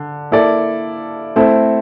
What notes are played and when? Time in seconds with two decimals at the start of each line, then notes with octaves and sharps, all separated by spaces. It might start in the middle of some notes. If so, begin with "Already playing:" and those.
Already playing: D3
0.31 A#3 E4 A4 D5
1.36 A3 C4 E4 A4